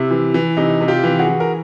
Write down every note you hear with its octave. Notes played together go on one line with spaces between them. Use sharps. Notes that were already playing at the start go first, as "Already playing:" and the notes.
Already playing: C3 E4
E3
E3
C3 D#4
C3
F4 G4
E3
F#4 G#4
E3
A#4